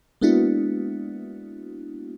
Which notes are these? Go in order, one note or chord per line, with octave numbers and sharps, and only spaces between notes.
G#3 A#3 B3 D4 E4 F#4